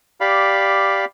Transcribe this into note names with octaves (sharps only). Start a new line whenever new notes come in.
G4 D5 F5 B5